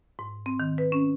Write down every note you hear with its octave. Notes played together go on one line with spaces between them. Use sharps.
G#2
C4
D#3
B4
C#4